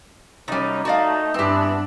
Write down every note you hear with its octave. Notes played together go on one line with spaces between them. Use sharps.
F#2 C3 G3 A#3 C#4 D#4
A3 D#4 F#4 D5 F5
G2 E3 B3 C4 D4 G4